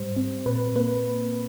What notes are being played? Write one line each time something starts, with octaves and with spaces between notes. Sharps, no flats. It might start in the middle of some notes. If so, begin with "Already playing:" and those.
Already playing: G#2 G3 C5
C4
A#2 B4
A#3 B4